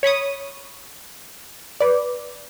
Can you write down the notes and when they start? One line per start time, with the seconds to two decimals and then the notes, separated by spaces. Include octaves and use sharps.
0.03 C#5 B5 C#6 D#6
1.80 B4 D5